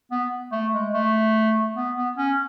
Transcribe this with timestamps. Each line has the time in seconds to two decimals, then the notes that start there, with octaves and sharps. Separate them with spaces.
0.11 B3
0.52 A3
0.73 G#3
0.93 A3
1.76 B3
1.96 B3
2.17 C#4